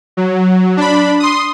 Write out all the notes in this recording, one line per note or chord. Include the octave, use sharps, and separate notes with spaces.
F#3
D4 B5
C6 D#6